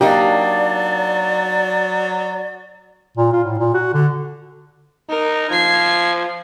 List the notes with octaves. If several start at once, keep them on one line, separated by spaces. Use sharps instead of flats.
F#3 A#3 D4 D#4 G4 D5
A#2
F4
A2
A#2
F#4
D3
D#4 A#4
F3 G#6 C7